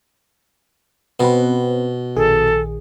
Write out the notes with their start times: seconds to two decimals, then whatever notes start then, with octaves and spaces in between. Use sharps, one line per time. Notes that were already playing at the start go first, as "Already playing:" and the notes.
1.20 B2 B3 C4 B4
2.16 A#1 D#3 G#4 A4